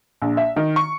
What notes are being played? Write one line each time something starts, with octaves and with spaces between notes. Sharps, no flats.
A#1
E5
D#3
C#6